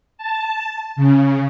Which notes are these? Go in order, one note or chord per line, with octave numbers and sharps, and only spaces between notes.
A5
C#3